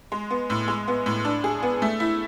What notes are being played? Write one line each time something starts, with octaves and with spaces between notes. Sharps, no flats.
G#3
B3
A2
G#3
B3
A2
D4
G#4
B3
A3
E4